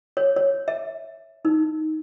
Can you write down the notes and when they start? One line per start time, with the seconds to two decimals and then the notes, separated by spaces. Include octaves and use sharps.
0.17 C#5
0.36 C#5
0.68 E5
1.45 D#4